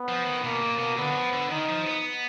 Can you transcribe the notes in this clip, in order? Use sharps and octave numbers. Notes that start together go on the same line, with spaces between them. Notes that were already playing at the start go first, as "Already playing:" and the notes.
Already playing: B3
F3
D#3
B2 A#3
A#2
B2
D3 B3
F#3
F3
D3
D#3 D#4
F3
B3